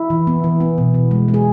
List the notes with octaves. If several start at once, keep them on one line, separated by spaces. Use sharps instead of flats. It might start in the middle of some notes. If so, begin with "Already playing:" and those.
Already playing: E4
E3
B3
E3
B3
B2
B2
G#3
G#3
G#4